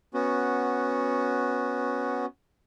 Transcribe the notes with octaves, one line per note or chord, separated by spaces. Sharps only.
B3 C#4 F#4